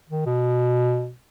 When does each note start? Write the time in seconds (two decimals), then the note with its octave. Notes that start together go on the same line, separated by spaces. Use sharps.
0.09 D#3
0.26 B2